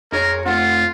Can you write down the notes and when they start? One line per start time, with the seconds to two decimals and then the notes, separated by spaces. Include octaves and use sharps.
0.12 F2 A#2 G#4 A#4 C#5
0.46 A3 C4 F4 F#5